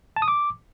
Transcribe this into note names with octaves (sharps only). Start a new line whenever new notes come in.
A5
D#6
D6